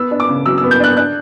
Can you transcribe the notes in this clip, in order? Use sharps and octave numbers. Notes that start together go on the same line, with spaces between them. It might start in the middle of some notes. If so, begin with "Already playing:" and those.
Already playing: B3 E6
D4
D6
C#3
F#3 E6
E6
B3
G6
D4 F#6
D4 F#6